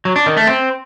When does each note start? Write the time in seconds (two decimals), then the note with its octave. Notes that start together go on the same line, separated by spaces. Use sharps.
0.05 F#3
0.16 D4
0.26 D#3
0.37 A3
0.47 C4